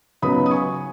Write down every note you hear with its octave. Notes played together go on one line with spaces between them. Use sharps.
C#2 C#3 F#3 B3 D#4 B5 D#6
D#6
G#5 C#6